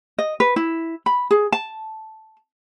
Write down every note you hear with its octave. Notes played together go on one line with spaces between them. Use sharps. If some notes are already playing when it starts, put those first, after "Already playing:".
D#5
B4
E4
B5
G#4
A5